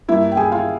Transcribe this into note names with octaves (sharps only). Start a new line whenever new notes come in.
G2 G3 A#3 E4 E5
G5
G#4 G#5
F4 F5